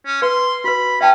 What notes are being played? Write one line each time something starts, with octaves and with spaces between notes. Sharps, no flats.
C#4
B4 C6
F#4 B4 B5
C#4 E5 G5 A5